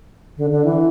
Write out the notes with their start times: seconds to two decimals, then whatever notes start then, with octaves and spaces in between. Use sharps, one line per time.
0.37 D3
0.50 D3
0.65 E3